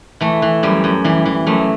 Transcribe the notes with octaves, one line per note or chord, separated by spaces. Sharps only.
E3 A3
E3
F#2 G3
F#2
E3 G3
E3
F#2 A3